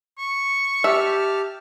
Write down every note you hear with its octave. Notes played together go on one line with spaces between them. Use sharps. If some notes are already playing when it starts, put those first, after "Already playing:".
C#6
G4 E5 A5 F6